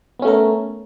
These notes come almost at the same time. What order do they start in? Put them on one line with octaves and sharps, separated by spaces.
B3 C#4 A3 A#4